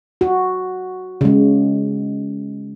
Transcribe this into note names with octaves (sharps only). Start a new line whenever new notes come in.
F#4
C#3 G#3